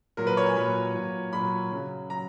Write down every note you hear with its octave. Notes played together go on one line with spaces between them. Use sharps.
A#2 F#3 A#4
B4
C#5
G#5
A#2 F#3 B5
A#2 F#3
A#2 F#3 B5
C#3 F#3
F#3 A#5